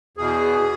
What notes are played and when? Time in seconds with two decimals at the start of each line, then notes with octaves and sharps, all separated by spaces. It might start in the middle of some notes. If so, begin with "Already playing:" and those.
0.17 E2 B2 G#4